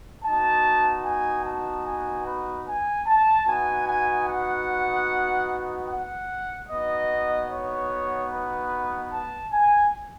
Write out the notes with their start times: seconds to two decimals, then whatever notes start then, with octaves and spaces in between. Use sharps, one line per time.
0.24 B3 D#4 F#4 A5
1.06 G#5
1.45 A5
1.85 G#5
2.26 B4
2.67 G#5
3.07 A5
3.47 B3 D#4 F#4 G#5
3.88 G#5
4.27 F#5
5.89 F#5
6.69 B3 D#4 F#4 D#5
7.51 C#5
8.31 B4
9.13 A5
9.53 G#5